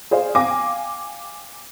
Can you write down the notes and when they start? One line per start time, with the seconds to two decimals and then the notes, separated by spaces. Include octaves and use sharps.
0.11 G#4 C5 D5 F5
0.35 F5 G5 G#5 D6 A#6